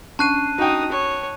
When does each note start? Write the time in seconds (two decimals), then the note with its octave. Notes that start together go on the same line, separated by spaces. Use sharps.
0.19 C#4 D4 A5 C#6 F#6 C7 D#7
0.58 D#4 F#4 G5 D#6
0.92 C#5